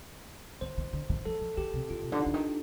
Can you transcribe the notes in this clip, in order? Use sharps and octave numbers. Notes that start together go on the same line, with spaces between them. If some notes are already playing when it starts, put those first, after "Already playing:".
D#3 C5
D#3
D3
D#3
F3 A4
F3
D#3 G4
C3
D3 F4
C3
D3 D4
D3 D#4
D#3